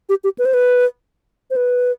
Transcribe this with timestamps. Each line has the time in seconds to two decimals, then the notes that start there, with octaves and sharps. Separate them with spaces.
0.09 G4
0.24 G4
0.39 B4
0.45 C5
0.54 B4
1.51 C5
1.56 B4